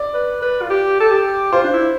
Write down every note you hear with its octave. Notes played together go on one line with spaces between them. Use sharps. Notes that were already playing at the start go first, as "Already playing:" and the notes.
Already playing: D5
B4
B4
F4
G4
A4
G4
F4 C5
D4
E4